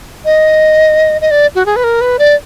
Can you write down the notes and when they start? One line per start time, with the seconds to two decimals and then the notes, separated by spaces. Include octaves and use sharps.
0.25 D#5
1.21 D#5
1.31 D5
1.55 F#4
1.66 G#4
1.76 B4
1.84 A#4
2.01 B4
2.19 D5